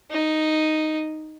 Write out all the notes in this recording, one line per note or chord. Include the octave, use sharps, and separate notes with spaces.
D#4